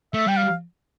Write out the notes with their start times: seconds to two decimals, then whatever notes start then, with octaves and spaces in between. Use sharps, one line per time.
0.14 A3 E5
0.27 G3 G5
0.37 F5